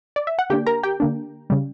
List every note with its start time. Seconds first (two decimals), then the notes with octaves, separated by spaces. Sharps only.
0.16 D5
0.27 E5
0.39 F#5
0.50 D3 A#3 D4 G4 G5
0.67 A#4 A#5
0.83 G4 G5
1.00 D3 A#3 D4
1.50 C#3 G3